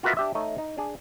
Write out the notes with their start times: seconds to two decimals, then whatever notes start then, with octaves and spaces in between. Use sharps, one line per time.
0.03 F4 F#4 A#4 B4 D#5 E5
0.17 D4 G4 E5
0.35 A3 D#4 C#5 D#5
0.58 D#4
0.78 D4 G#4